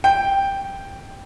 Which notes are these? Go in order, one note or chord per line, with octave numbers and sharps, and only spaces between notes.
G5